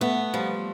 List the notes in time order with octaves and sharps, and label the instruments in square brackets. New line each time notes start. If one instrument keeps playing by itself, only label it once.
[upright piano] A3 [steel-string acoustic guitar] B3
[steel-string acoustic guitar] F3 [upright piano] G3